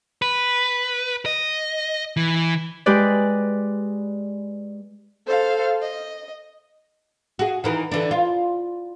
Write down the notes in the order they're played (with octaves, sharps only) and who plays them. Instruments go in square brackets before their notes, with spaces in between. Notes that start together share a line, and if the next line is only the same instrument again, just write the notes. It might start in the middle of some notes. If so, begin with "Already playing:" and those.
[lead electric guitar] B4
D#5
E3
[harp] G#3 G4 B4 D5
[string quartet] A4 C5 F5
D#5
[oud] F#4 G#4
D#3 E3 A#4
D3 E3 D4
F4